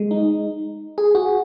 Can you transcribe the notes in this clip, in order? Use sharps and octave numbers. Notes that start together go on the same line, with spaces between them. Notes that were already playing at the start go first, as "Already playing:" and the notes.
Already playing: G#3
D#4
G#4
F#4